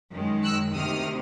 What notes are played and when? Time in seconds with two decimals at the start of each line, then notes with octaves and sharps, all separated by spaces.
0.12 F#2 D#3 G#3
0.44 E6 F#6
0.75 D2 C3 D#3 D#6 F6